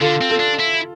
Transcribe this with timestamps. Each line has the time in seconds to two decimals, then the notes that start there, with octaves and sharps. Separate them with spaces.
0.01 D3 F4 A4
0.21 C4
0.30 F4 A4
0.39 D4
0.59 E4